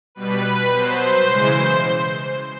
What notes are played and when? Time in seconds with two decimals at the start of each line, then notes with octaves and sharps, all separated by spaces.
0.15 B2 G3 B4
0.72 B2 F#3 C5
1.28 C#3 E3 G#3